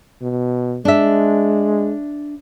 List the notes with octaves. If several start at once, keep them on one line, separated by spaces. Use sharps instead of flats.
B2
G#3 D4 E5